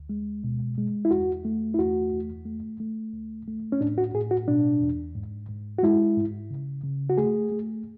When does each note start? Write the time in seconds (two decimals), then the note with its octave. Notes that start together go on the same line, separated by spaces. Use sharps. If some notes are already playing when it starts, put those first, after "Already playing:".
Already playing: D2
0.09 G#3
0.44 B2
0.78 G#3
1.05 E4
1.11 E2 F#4
1.45 A3
1.74 E4
1.79 E2 F#4
2.13 E2
2.45 A3
2.80 A3
3.13 C#2
3.48 A3
3.72 C#4
3.81 A2 D4
3.98 F#4
4.14 A2 G#4
4.31 F#4
4.48 B2 D4
4.82 E2
5.15 G#2
5.49 G#2
5.79 F#4
5.83 G#3 E4
6.17 G#2
6.50 C#3
6.84 C#3
7.10 F#4
7.18 A3 G#4
7.52 A3